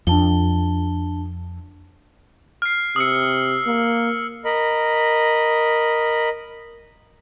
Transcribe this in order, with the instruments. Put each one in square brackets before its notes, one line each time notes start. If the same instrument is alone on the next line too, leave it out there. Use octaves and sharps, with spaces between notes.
[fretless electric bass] F2 [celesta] D4 A5 G7
[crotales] F6 C7
[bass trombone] C3 [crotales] D#6 E6 C#7
[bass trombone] A#3
[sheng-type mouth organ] A#4 D#5 B5